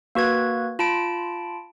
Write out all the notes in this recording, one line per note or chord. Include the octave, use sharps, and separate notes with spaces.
A#3 F#4 B4 G#6
F4 A5 B5 D7